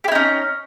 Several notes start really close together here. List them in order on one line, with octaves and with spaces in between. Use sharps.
G4 E4 D#4 C#4